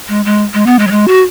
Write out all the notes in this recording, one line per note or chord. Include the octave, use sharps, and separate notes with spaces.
G#3
G#3
G#3
B3
G#3
F#3
G#3
F#4